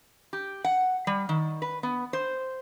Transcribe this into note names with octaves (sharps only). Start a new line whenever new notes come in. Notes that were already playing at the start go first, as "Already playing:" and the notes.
G4
F#5
G3
D#3
B4
B3
C5